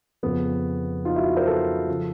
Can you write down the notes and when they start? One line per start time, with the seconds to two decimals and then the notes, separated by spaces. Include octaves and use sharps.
0.23 F2 C#3 F3 B3
1.05 D#4 F4
1.16 E4 F#4
1.36 A#4 C5
1.47 A4 B4
1.88 C#3 F3